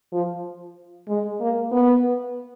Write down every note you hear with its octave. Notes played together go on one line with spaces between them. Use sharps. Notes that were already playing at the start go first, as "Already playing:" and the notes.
F3
G#3
A#3
B3